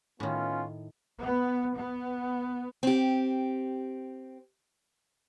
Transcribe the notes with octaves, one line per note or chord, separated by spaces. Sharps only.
A2 D#3 B3 C#4 F4
B3
B3
C4 G4